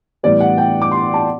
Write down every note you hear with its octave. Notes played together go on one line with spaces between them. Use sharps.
A2 E3 G3 B3 D5
F#5
G5
D6
C6
A5